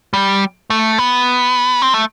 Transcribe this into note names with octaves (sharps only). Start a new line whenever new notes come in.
G3
A3
B3
C4
A3